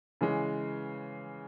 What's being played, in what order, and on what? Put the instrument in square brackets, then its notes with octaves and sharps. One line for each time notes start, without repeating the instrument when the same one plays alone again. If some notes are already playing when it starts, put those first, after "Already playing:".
[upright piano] C#3 E3 G#3